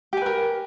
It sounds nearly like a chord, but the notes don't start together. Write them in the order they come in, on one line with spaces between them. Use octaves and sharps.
G4 G#5 B4 A#4